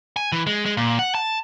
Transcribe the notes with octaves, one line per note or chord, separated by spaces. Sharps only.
G#5
E3
G#3
G#3
A#2
F#5
A5